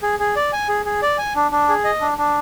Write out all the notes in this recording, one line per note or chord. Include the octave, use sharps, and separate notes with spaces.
G#4
G#4
D5
G#5
G#4
G#4
D5
G#5
D4
D4
G#4
D#5
D4
D4